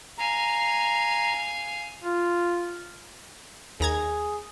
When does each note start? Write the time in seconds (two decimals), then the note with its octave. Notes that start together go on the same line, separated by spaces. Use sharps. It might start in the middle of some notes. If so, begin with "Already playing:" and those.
0.18 F5 G#5 A#5
2.03 F4
3.80 D#2 G#4 A#5 G#6